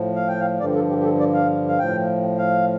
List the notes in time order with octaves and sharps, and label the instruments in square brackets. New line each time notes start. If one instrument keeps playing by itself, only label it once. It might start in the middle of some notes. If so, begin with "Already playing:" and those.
Already playing: [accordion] A2 F3
F5
G5
F5
G2 D3 F3 D5
A4
G4
G4
A4
D5
F5
F5
A2 F3 G5
F5